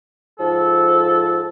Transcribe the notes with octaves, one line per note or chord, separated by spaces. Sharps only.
G#2 F3 A4